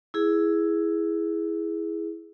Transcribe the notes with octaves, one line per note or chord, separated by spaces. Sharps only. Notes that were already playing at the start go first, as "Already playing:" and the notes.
E4 G#4